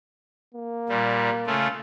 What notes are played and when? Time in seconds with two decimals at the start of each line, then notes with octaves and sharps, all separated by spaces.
0.54 A#3
0.89 A#2 G3
1.47 C#3 A3 F4